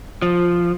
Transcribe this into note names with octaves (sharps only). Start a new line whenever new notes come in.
F3